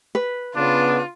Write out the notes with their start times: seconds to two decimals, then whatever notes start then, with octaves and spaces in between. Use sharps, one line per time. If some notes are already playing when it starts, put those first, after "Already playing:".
0.15 B4
0.56 C#3 B3 D4 F4